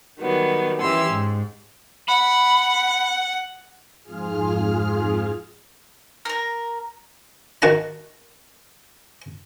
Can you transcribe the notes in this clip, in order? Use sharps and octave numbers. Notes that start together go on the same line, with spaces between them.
D#3 F#3 G3 B3
E3 C#4 G4 C6 E6
G#2
F#5 B5
F2 G#2 F4 G#4 F6
A#4 A#5
D#3 F#4 F#5 A5 A#5